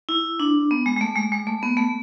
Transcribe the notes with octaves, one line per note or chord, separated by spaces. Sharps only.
E4
D4
B3
G#3
G#3
A3
G#3
G#3
A3
B3
A3